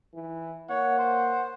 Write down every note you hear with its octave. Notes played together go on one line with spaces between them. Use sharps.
E3
A#3 C#5 F#5
C5